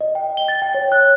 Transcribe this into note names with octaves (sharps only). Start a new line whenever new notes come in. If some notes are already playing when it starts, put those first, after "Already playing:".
D#5
G5
G7
A6
G5
C#5
F#6